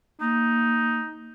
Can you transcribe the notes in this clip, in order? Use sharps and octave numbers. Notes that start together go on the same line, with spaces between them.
A#3 D#4